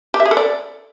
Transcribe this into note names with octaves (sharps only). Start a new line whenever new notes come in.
G4
E5
G#4
A4
D5